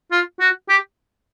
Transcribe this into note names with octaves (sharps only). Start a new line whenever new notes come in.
F4
F#4
G4